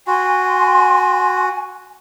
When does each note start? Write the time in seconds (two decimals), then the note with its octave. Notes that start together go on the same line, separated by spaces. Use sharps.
0.07 F#4 G#5 C6